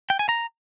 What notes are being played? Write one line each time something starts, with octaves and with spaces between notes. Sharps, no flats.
G5
G#5
A#5